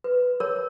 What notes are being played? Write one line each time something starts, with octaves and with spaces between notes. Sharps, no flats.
B4
A#4 C#5